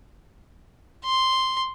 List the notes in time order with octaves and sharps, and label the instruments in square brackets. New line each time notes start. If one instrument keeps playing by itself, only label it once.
[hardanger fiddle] C6